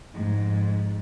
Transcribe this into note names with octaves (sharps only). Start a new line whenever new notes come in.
F2 G#2